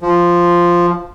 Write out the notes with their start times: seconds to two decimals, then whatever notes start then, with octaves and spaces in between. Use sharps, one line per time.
0.02 F3